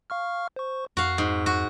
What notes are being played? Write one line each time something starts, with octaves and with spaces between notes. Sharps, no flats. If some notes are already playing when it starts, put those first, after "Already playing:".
F5 C#6 F6
C5 C#6
F2 F#4 F5
G#2
F#4